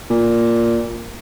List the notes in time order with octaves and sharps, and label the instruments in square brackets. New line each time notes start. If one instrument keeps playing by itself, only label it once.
[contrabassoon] A#2